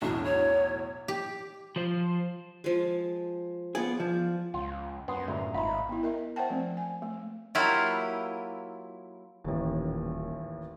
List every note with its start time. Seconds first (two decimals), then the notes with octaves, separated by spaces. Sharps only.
0.02 B1 E2 A2 D4
0.25 C#5
1.08 G4
1.76 F3 C5
2.64 F3 G#3
3.75 B3 F4 G#4 D5
4.00 F3
4.54 C#2 F4
5.08 F#2 B3 C#4 C6 D#6
5.28 G1 D2 A2 E5 A#5
5.54 G#1 D#4 F4 D#5 E5 B5
5.89 B3 E4
6.03 A#4 D#5 E5
6.36 C5 E5 F#5 G5 A5
6.50 F3 A3 C4
6.77 G#5
7.02 A3
7.55 F#3 A#3 E4 F4 G4
9.44 D#1 A1 D#2